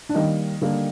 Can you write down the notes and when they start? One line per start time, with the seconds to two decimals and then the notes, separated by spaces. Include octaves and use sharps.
0.09 D4
0.14 D#3 G3 A#3 D#4
0.62 D3 G3 A#3